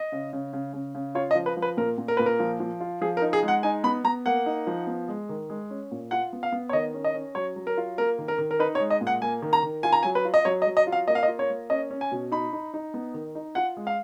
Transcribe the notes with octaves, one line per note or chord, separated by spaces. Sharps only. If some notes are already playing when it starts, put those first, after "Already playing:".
Already playing: D#5
C#3
C#3
C#3
C#3
C#3
F4 C#5
D#5
F3
B4
F3
B4
A#2 A#4
A#2
A#4
A#2 B4
A#4
F3
F3
F4
F3 G#4
A#4
D#4
G#4
G#3
F#5
D#4 G#5
B3 B5
B3 A#5
A#3 F#5
D#4
F3
B3
G#3
D#3
G#3
C#4
A#2
F4 F#5
B3
F5
B3
C#5
D#3 D#5
C#4
D#5
C#4
F#3 C#5
F#3
A#4
F4
A#3 A#4
D#3
A#4
D#3
A#4
D#4 B4
C#5
G#3
D#5
A#2
F#5
A#3 G#5
D#3
A#5
D#3
F4 G#5
A#5
F#3 G#5
B4
F4
D#5
F#3 C#5
D#5
F#3
D#5
F4
F5
A#3 D#5
F5
D#5
F4
C#5
A#3
C#4 D#5
C#4
G#5
B2
D#4 B5
D#4
D#4
B3
D#3
D#4
F4 F#5
G#3
F5